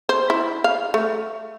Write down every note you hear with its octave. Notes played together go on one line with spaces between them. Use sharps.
C5
E4
F5
A3